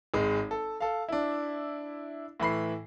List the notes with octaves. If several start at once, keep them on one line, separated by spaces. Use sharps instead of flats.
G#1 G#3
A4
A4 F5
D4 E4
A2 E3 B5 C7